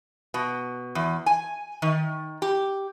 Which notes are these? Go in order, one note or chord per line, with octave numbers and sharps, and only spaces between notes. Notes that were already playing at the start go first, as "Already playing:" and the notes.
B2
E2
G#5
D#3
G4